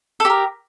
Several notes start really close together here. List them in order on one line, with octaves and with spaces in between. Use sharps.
A4 G4 A#4